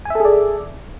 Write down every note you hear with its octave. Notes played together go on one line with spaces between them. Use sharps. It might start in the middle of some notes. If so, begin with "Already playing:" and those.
G#4 A4 D5 E5 G#5